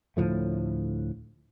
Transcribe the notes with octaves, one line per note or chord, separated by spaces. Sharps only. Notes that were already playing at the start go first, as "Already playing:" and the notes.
D2 A2 F3 A3